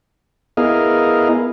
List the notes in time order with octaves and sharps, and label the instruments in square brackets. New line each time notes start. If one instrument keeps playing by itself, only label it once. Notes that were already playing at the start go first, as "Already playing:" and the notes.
[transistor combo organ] B3 E4 G#4 A#4 D#5 F5